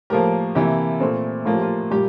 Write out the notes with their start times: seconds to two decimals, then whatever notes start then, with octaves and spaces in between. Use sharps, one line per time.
0.10 A2 F3 A#3 G4 A#4
0.55 C3 E3 A#3 G4
1.00 A#2 A3 C4
1.45 A2 F3 A#3 F4
1.54 G4
1.62 F4
1.90 A#2 G3 A#3 G4